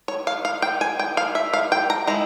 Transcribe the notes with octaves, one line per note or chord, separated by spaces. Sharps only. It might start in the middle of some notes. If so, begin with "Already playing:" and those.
C#5
F5
F5
G5
G#5
G5
F5
E5
F5
G5
A#5
G#3 E4 A#5